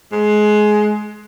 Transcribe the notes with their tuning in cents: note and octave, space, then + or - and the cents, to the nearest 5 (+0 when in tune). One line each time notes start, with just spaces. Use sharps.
G#3 +20